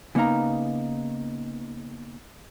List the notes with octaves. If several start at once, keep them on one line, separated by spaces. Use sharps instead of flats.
C#3 A#3 B3 D#4 F5 A#5